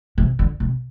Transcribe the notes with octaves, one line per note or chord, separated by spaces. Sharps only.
C3
D3
C3